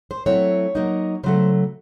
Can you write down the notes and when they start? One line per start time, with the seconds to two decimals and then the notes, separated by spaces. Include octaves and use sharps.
0.11 C5
0.26 F#3 A3 C4 E4 C#5
0.75 F#3 A#3 D#4
1.24 C#3 F#3 A3 C5